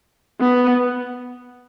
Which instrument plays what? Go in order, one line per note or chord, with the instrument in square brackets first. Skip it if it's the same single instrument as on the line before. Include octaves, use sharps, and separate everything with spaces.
[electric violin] B3